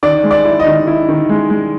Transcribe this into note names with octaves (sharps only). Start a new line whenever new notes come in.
D#3 D5
G#3
D5
E4
D#5
D#3
E4
D#3
G#3
G#3